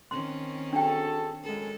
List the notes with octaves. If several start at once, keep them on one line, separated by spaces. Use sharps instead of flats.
D#3 C4 C#4 C6
D4 F#4 G#4 A4 G5
F#2 G#3 A4